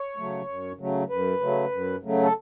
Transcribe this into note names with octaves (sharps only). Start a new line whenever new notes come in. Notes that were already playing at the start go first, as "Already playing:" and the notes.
Already playing: C#5
C#3 F#3 A3
F#2
C#3 F#3 A3
F#2 B4
C#3 F#3 A3
F#2
C#3 F#3 A3
A4